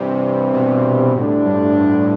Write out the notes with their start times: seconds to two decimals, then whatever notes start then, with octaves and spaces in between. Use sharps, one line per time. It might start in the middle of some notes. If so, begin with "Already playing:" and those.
Already playing: G2 C3 E3 G3 C4
0.53 B2
1.14 D2 A2 D3 G3 D4
1.45 G2
1.76 G2